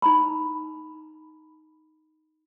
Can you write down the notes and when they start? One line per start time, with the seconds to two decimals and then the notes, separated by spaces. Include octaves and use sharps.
0.02 D#4 A#5 B5